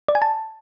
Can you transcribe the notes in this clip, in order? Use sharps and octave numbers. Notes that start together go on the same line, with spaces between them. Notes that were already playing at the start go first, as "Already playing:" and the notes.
D5
G#5
A5